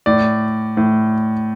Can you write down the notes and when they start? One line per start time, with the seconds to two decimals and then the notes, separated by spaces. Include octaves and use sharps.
0.06 A2 D5
0.77 A2